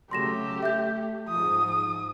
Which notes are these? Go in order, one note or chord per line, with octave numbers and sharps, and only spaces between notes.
C#3 F#3 A3 G4 C6 A#6 E7
A3 E5 G6
G#2 F3 D#6